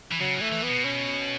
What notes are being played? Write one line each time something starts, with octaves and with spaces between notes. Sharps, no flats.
E3
C#3 F#3
E3
A3
E3
B3
B2
C#4